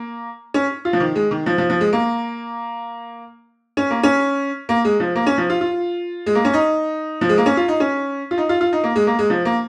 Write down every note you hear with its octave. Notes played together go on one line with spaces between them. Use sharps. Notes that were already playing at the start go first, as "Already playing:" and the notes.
Already playing: A#3
C#4
F4
F3
D#3
G#3
D#3
F3
F3
F3
G#3
A#3
C#4
A#3
C#4
A#3
G#3
F3
A#3
C#4
F3
F4
F4
G#3
A#3
C#4
D#4
F3
G#3
A#3
C#4
F4
D#4
C#4
F4
D#4
F4
F4
D#4
A#3
G#3
A#3
G#3
F3
A#3